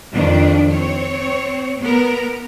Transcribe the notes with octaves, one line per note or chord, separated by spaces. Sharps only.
F2 D#3 D4
C4 C#5
B3 A#4